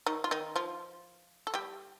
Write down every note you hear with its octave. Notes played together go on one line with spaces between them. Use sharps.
D#3 D#4
F4
D#3 D#4
F3 F4
A4
G3 G4